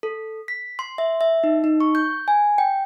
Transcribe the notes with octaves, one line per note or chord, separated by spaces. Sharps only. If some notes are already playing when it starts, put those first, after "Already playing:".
A4
B6
C6
E5
E5
D#4
D#4
C#6
G6
G#5
G5